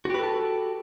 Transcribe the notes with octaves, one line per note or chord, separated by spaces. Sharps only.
F#4 G4 A4 B4 A5